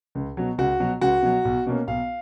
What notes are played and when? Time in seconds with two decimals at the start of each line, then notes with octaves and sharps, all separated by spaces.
0.15 C#2
0.37 B2 F#3
0.58 C#2 F#4
0.80 B2 F#3
1.01 C#2 F#4
1.22 B2 F#3
1.45 B1
1.66 B2 A#3 C#4
1.87 B1 F5